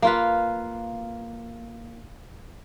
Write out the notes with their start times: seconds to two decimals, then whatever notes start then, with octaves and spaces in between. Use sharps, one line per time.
0.02 A#3 F4 B4